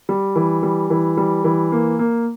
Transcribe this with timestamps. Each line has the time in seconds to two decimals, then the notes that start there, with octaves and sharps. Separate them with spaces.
0.09 G3
0.36 E3
0.63 G3
0.90 E3
1.17 G3
1.44 E3
1.72 A#3
1.99 A#3